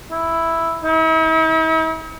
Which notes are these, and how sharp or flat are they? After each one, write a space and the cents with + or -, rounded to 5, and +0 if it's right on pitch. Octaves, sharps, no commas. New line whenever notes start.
E4 +0
E4 -45